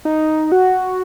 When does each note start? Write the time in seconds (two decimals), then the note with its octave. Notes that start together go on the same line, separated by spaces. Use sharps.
0.05 D#4
0.52 F#4